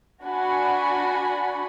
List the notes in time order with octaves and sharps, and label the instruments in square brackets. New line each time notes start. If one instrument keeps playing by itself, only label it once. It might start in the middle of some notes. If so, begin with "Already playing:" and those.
[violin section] D4 F#4 F#5 G#5 B5